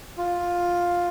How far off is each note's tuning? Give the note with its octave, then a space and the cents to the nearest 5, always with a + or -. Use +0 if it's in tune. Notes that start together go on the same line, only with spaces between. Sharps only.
F4 +10